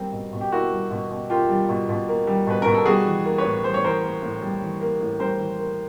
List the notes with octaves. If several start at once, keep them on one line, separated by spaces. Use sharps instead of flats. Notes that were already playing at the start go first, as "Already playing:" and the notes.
Already playing: G3 A#3 C4
B2
B2
G4
A#3 E4 F#4
G3
B2
B2
A#3 F4 G4
G3
B2
B2
A#3
G3
B2 B4
B2 A#4
A4
G3 F#4 G#4
E3
A#3
B4 C#5
A2
G3 C5
C#5
E3 A#4 C5
A#3
A2
G3
E3
A#3
A2
G3 A#4 C5
E3
A#3